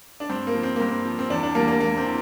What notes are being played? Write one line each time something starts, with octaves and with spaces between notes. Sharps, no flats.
D4
G2 C4
A#3
F3
C4
G2 A#3
C4
F3
C4
E2 D4
D4
E3 G3 A#3
A#3
E2 A#3
C4
E3